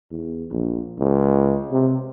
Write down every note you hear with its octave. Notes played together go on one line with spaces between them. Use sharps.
E2
A#1
C#2
C3